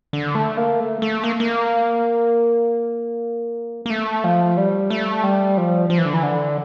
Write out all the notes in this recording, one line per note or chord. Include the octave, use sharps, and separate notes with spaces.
D3
A3
A#3
A3
A3
A#3
A#3
A#3
A3
F3
G3
A3
G3
F3
F3
E3
D3
E3
D3